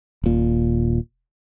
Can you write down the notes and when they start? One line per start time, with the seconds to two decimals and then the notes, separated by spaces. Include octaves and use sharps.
0.24 D#1 A#2